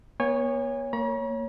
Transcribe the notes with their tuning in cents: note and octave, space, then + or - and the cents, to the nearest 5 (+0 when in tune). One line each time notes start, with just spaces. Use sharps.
B3 -40 C#5 +0 G#5 -35
A#3 -15 C#5 +0 A#5 +45